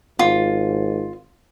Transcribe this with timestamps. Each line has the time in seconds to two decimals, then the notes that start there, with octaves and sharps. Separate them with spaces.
0.19 G#1 F4